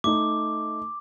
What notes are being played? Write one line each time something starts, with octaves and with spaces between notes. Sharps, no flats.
A3 D#4 D6